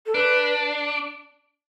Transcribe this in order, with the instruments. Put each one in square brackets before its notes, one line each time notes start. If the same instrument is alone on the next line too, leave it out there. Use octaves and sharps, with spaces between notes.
[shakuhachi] A4
[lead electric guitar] D4 [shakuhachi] B4